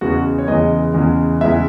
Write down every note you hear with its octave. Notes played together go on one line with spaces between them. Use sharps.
E2 C#3 E3 G#3 F#4
C#5
E2 C#3 E3 G#3 D#5
E2 C#3 E3 G#3
E2 C#3 E3 G#3 E5